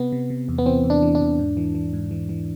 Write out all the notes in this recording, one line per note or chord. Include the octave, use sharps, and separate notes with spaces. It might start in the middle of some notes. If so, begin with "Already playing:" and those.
Already playing: C3 B3
C3
C3
E2
B3
E3 C4
E2
D4
E3
D4
E2
G#2
E3
E3
G#2
E3
E3